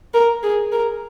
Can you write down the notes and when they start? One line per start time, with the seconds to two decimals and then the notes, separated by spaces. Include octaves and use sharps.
0.14 A#4
0.43 G#4
0.72 A#4